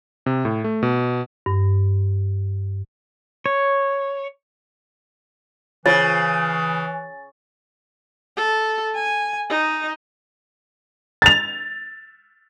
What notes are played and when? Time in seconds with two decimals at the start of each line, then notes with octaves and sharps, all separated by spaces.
0.26 C3
0.45 A2
0.64 A3
0.83 B2
1.46 G2
3.46 C#5
5.86 C#3 E3 F4 C5 C#5 A6
8.37 A4
8.95 G#5
9.50 D#4
11.22 A6 F7